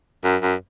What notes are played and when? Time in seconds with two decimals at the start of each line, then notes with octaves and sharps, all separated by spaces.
0.24 F#2
0.42 F#2